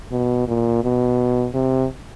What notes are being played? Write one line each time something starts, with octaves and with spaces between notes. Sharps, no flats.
B2
A#2
B2
C3